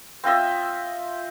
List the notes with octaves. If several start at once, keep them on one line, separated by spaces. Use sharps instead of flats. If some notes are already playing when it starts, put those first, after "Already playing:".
C4 F4 D#5 E5